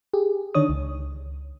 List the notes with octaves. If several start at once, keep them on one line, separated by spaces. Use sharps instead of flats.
G4 G#4
D3 D#3 D4 C#5 D#6
C#2